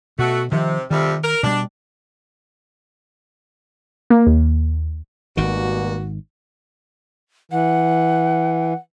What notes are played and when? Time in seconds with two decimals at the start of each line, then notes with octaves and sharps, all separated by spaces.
0.19 B2 A3 F#4
0.52 C3 D#3 F3
0.91 F2 C3 D#3 G3
1.23 A#4
1.43 B2 G3 D4
4.10 A#3
4.27 D#2
5.37 G#1 B2 D#3 G3 A#3 F#4
7.52 E3 F#5